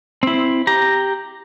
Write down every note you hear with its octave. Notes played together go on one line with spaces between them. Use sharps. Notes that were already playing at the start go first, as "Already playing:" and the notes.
C4 E4
G4 A#5